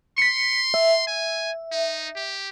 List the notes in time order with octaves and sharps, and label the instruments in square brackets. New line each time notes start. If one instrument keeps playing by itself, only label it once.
[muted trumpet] C6 [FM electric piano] B6 C#7
[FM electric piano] E5
[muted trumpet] G#5
D#4
G4